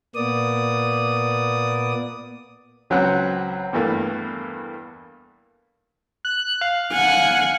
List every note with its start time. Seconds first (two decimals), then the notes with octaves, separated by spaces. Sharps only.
0.15 A#2 A#3 B3 D5 D#6
2.90 C#2 F#3 C4 C#4 B4 F#5
3.73 E2 G2 E3 A3 A#3
6.25 F#6
6.61 F5
6.92 F#5 G#5